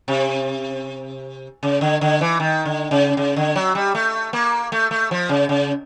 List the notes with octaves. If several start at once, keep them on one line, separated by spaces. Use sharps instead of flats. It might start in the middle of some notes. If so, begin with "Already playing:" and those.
C3
C#3
D3
D3
E3
D#3
D3
C#3
C#3
D3
F#3
G3
A3
A#3
A3
A3
F3
C#3
C#3